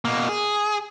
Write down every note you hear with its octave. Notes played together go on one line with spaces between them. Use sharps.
B2 A#3
G#4